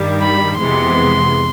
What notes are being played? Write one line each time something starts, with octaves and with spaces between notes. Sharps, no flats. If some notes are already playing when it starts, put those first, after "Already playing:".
Already playing: G2 D#3 G3
B5
F2 C3 E3 G#3 B3 C6